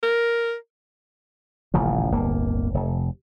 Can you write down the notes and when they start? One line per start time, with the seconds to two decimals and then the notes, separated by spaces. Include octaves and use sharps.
0.03 A#4
1.74 D#1 A1 C#3 F3
2.12 D1 G1 A#3
2.74 F1